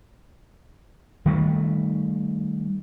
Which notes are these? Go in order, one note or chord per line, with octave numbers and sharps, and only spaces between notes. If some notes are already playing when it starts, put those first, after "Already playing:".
D#3 G3 A3